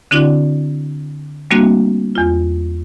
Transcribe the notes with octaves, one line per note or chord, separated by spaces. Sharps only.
D3 C4 D4 E4 F#4 D5
G3 A3 A#3 C4 D4 F#4
E2 F4